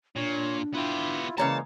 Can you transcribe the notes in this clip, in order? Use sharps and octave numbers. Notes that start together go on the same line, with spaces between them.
A#2 D4 C#5
B3 E4 F4 G4
C#3 E3 G#3 A#3 C#5 A5 A#5